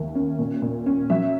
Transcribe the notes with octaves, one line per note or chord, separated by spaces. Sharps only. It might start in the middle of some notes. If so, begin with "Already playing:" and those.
Already playing: D#2 A#3 E5
C#4
A#2
A#2
C#4
F#3 E5